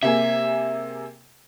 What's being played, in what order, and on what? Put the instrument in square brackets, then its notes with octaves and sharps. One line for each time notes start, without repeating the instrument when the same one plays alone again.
[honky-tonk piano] C3 A#3 G#4 [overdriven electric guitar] E5